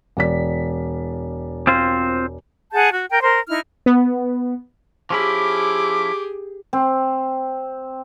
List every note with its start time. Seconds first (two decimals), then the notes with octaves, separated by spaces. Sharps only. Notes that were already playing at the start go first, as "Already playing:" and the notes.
0.17 E1 D5 B6
1.67 C4 F4 C5
2.73 G#4 F#5 A5 G6
2.93 F#4
3.10 A#4 G5
3.22 A#4 C5
3.49 D#4 E4 F6
3.86 B3
5.10 F3 C#4 E4 G4 G#4 D6
6.73 C4